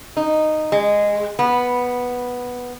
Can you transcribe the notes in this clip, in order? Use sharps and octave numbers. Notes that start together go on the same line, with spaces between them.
D#4
G#3
B3